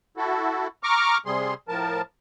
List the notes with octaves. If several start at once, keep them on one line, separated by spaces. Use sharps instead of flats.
E4 F#4 A4
A#5 C#6 D6 F6
C3 G3 G#4 C6
A2 F3 A#4 A5